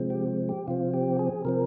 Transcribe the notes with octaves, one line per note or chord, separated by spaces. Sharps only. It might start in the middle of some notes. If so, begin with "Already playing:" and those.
Already playing: C3 F3 G#3 C4
G4
G4
C3 F3 C4 F4
G4
G#4
C3 F3 C4 A#4